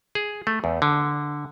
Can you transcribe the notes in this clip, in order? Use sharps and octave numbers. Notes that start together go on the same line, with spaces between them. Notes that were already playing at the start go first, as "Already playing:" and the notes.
G#4
A3
E2
D3